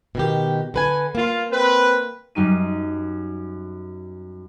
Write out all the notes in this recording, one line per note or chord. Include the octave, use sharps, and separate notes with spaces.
B2 D#3 G4
D3 B4 G#5
A#3 F4
C4 B4
F#2 G3 D#4 D#7